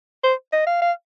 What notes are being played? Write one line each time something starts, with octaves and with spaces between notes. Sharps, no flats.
C5
D#5
F5
F5